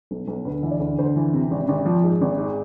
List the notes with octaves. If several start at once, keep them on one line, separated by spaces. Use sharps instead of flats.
B1
B1
D2 B4
E3 E5
D5
D2
D2 C5
E3
C3
G#1
G#1
F3
G#2
G#1
G#2